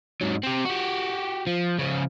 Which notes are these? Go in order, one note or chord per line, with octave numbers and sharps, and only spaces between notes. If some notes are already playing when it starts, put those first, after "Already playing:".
G#2 F#3
C4 G4
F#4 G4
F3
C#3 F3